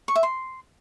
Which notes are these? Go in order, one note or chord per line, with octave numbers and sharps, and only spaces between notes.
C#6
E5
C6